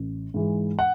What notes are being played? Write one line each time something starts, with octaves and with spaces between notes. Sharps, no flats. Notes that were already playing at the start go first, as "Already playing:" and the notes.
Already playing: A1
G#2 E3 G#3
F#5